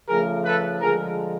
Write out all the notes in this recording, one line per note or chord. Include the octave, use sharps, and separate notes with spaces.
C#3 F3 A3 G#4 A#4
A4 B4
D3 F3 G#3 G#4 A#4